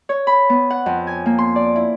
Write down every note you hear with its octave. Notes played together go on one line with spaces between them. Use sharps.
C#5
B5
B3
F#5
F2
G#5
A#3
C6
D5
E4